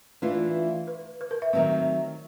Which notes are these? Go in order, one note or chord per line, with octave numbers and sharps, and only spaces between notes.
E3 A3 D4 F4 B4
B4
B4
A#4
E5
D#3 F#3 A3 C4 E5